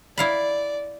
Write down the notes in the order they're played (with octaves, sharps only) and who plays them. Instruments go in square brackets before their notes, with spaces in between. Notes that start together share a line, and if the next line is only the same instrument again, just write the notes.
[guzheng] E4 F5 B5 [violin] D5